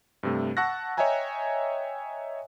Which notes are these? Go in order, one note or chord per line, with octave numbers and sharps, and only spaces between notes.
G2 C3 A3
F#5 A5 C#6 E6 F#6 A#6
C#5 D#5 E5 G5 G#5 A#5